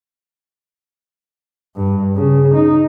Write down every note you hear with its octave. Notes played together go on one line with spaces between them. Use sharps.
G2
C#3
D#4